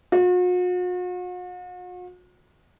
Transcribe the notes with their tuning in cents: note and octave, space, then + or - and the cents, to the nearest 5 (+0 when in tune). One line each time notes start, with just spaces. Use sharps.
F#4 -45